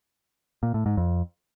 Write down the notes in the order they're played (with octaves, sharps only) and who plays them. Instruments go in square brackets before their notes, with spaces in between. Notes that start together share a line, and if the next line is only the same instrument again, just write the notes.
[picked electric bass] A#2
A2
G#2
F2